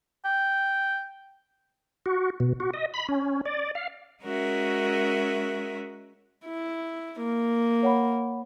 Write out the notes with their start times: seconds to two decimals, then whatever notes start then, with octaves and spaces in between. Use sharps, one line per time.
0.25 G5
2.06 F#4
2.40 B2
2.60 F#4
2.74 D#5
2.94 B5
3.08 C#4
3.46 D5
3.75 F5
4.23 G#3 C#4 F#4 A#4 E5
6.45 E4
7.19 A#3
7.83 C#5 F#5 B5